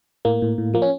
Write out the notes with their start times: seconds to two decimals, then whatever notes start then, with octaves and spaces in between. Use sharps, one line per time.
0.25 A2 A#3
0.42 A2
0.58 A2
0.74 F3 A#3
0.82 C#4